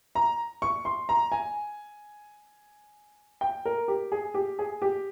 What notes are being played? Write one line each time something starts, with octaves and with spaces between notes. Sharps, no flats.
A#5
C#6
C6
A#5
G#5
G5
A#4
G4
G#4
G4
G#4
G4